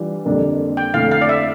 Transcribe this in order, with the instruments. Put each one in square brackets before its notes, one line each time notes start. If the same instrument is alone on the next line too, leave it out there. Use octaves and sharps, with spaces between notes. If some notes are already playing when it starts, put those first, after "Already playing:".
Already playing: [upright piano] E3 G3 D4 F4
F2 D3 G3 A#3 D4
[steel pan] G5
[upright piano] F2 D3 A3 E4 [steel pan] F5
[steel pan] F5
D5
E5